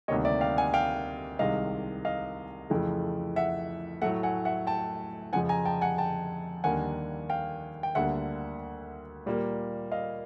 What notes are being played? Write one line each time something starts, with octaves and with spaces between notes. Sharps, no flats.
D2 C3 D#3 G3 A#3 C#5 D#5
D5 E5
F5 G5
F#5 G#5
F5 G5
C2 C3 D#3 G#3 D#5 F5
D#5 F5
F2 C#3 E3 A3
E5 F#5
A2 F#3 A3 E5 F#5
F#5 G#5
E5 F#5
G5 A5
F2 C#3 F3 F#5 G#5
G#5 A#5
G5 A5
F#5 G#5
G5 A5
D#2 D3 G3 A#3 F#5 G#5
F5 G5
G5
D2 D3 G3 A#3 E5 F#5
A#2 G3 A#3
D#5 F5